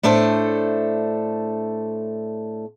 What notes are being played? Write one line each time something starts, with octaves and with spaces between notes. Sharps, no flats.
A2 A3 D4 A4 C5